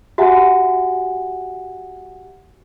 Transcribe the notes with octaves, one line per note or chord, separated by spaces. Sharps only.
F#4 G4 E5 F#5 G#5 A#5